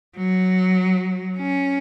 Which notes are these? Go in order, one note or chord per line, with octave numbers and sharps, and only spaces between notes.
F#3
C#4